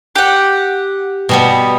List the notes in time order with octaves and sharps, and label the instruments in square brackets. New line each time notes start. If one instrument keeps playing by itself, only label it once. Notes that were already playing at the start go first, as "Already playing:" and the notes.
[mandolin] G4 F#5
[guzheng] B2 G3 B3